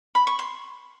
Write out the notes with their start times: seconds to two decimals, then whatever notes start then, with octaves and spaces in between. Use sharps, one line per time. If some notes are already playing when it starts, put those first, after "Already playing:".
0.15 B5
0.27 C#6
0.39 C6